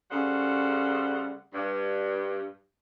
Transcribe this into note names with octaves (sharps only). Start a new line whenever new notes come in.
C#3 G3 A3 C5 F#5
G2